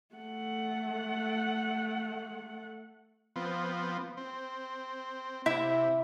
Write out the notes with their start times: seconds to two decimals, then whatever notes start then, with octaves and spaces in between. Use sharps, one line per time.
0.15 A3 F#5
3.36 F3 B3 C4
4.17 C4
5.46 C3 E4 E5